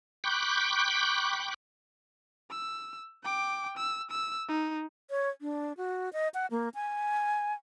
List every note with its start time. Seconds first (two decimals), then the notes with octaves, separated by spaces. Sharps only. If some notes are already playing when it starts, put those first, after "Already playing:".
0.24 G5 B5 C#6 D6 F#6 G6
2.51 E6
3.24 G5 D6
3.77 E6
4.11 E6
4.48 D#4
5.10 C#5
5.42 D4
5.77 F#4
6.13 D#5
6.34 F#5
6.51 A#3
6.75 G#5